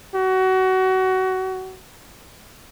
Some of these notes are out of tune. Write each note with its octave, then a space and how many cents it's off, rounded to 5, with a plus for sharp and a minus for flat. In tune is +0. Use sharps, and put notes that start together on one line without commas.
F#4 +25